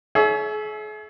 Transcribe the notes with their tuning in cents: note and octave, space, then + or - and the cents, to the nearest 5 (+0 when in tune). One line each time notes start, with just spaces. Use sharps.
G#4 +40 C#5 +20 E5 -5